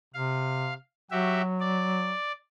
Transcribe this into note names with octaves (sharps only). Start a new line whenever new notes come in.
C3 F5
F#3 F#4 G4 E5
D5